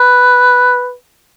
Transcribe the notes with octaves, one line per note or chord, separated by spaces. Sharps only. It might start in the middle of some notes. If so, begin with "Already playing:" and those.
Already playing: B4